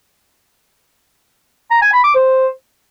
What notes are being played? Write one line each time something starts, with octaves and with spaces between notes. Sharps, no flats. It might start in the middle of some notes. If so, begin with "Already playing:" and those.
A#5
G#5
B5
D6
C5